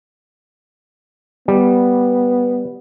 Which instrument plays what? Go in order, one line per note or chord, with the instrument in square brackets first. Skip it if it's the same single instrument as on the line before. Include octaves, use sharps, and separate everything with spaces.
[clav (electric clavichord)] G3 [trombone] B3